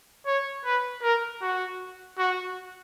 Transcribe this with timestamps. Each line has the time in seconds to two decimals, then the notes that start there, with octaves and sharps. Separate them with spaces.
0.26 C#5
0.65 B4
1.02 A#4
1.42 F#4
2.19 F#4